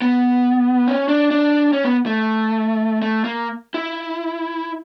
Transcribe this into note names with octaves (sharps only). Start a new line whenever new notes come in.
B3
C#4
D4
D4
C#4
B3
A3
A3
A#3
E4